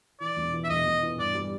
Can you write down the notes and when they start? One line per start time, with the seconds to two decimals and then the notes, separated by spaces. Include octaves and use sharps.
0.20 E3 D5
0.36 E1
0.53 E3
0.64 E5
0.70 E1 D#5
0.86 E1
1.02 E3
1.18 G2 D5
1.35 G3